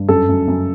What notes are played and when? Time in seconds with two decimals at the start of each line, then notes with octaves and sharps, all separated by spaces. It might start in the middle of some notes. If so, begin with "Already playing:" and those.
Already playing: G2
0.09 F#2 A4
0.29 F#2
0.48 F#2